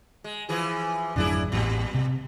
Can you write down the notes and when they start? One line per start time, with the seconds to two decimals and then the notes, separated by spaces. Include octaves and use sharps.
0.24 G#3
0.49 E3 F3 G#4
1.16 G#1 F2 F#3 D4 E4 G#4
1.52 A1 A#2 G3
1.94 C3